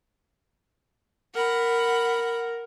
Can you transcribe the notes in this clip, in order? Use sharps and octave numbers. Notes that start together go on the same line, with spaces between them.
A#4 F#5 B5